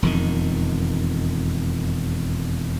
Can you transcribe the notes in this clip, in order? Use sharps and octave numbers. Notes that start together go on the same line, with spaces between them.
E1 F2 D#3